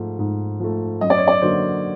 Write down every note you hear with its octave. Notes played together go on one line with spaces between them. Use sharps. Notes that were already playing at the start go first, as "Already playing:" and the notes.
Already playing: G#2 F3 A3
G#2
F3 A3
F#2 D#5
D5
C#5
D5
D3 F#3 A#3 C5